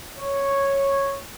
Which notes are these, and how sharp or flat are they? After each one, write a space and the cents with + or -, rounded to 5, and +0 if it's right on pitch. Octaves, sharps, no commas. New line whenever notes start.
C#5 -5